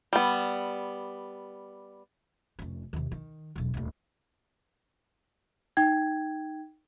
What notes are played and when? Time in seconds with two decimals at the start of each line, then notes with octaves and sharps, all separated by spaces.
0.13 G3 B3
2.59 F1 C#4
2.93 D#2 C3
3.11 D#3
3.55 E1 B1
3.74 D#1 D2
5.77 D#4 G5 G#6